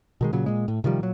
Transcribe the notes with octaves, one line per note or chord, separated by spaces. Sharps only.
B2 D#3 G#3
A#2 C#3 F#3
A#2 G#3
A2
C3 D#3 F3 G3
A#2 F#3